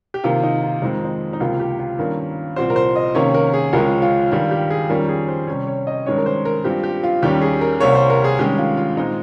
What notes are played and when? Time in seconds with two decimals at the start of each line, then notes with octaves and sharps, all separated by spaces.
0.14 G4
0.24 C3 D#3 A#3 F4
0.43 D#4
0.63 F4
0.82 F2 D#3 G#3 C4 D#4
1.04 D#4
1.33 D#4
1.40 C#2 C3 F3 A#3 F4
1.60 G4
1.79 F4
1.99 G2 D#3 A#3 C#4
2.56 C2 A#2 F3 C4 C5
2.70 A#4
2.76 C5
2.96 D#5
3.15 C3 D#3 A#3 C#4 C#5
3.34 A#4
3.54 G#4
3.73 C#2 C#3 F3 G#3 C#4 A#4
4.02 F4
4.31 G2 D#3 G3 F4
4.51 G4
4.70 G#4
4.89 F2 D#3 G3 C#4 A#4
5.09 G#4
5.28 C5
5.48 C3 G3 C#4 C#5
5.67 C#5
5.87 D#5
6.06 G2 D#3 G#3 C#4 C#5
6.18 A#4
6.26 C5
6.45 A#4
6.64 G2 F3 C4 G4
6.83 G4
7.03 F4
7.22 D#2 D#3 G3 C#4 G4
7.41 G#4
7.61 A#4
7.80 C2 C3 G3 A#3 C#5
7.95 C5
8.10 A#4
8.24 G#4
8.39 G2 D#3 G#3 C#4 G4
8.58 F4
8.77 F4
8.97 A#2 G#3 C4 D#4